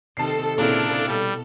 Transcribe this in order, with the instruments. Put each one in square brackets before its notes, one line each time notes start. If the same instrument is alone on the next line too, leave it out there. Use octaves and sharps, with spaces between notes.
[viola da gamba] C3 D#3 [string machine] A4 [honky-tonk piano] A5 C7
[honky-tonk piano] A#2 C#3 [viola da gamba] C4 E4 A#4 [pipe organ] D4
[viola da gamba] B2 [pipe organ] G3